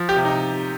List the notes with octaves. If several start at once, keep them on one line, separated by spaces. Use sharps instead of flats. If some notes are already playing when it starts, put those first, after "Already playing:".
Already playing: F3
G4
C3
D#4